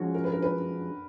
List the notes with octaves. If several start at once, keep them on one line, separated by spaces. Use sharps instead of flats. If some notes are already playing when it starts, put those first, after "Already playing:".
Already playing: F3 G#3 C#4 F#4
A#4
B4
A#4
B4